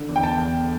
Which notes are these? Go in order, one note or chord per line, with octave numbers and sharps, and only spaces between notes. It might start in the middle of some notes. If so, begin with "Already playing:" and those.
Already playing: D3
E2
G5
A5
E2